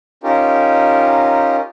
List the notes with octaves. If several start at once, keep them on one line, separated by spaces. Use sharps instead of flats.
C#4 D#4 F4 G4 A#4